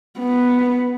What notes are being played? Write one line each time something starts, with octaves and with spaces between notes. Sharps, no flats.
B3